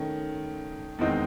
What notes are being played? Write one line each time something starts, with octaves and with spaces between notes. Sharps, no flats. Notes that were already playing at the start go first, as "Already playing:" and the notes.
Already playing: D#3 A3 C#4
E2 D#3 G#3 C4 D#4